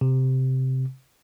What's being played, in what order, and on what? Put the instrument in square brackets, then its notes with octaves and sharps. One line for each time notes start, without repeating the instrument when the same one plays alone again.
[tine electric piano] C3